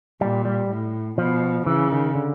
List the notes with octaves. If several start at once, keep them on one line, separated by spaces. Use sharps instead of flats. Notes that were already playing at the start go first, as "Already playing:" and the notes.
A#2 G3
G3
A2
B2 F3
C#3 E3
D#3
D3